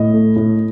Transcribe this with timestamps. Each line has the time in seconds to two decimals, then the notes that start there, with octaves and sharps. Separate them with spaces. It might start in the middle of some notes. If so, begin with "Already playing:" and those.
Already playing: A2 D#5
0.14 A3
0.36 A2